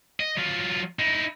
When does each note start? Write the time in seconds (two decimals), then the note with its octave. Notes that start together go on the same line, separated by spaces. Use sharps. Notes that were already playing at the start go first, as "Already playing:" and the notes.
0.20 D#5
0.37 F#3 F4
0.99 D#4 E4